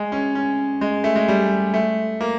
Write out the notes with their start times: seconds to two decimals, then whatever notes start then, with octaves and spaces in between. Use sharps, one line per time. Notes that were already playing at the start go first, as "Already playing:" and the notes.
Already playing: G#3
0.12 C#4
0.35 C#4
0.81 G#3
1.04 A3
1.16 G#3
1.28 G3
1.74 A3
2.21 A#3